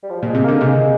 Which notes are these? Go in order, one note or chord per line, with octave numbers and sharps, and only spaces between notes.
G3
F3
A#2 G#3
C3
D3 A#3
C3 G#3